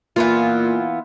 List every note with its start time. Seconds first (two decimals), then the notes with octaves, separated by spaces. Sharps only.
0.16 A#2 E3 B3 F4